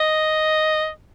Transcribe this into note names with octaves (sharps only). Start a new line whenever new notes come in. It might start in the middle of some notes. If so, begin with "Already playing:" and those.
Already playing: D#5